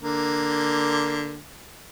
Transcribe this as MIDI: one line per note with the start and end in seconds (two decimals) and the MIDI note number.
0.02 1.40 50
0.02 1.40 58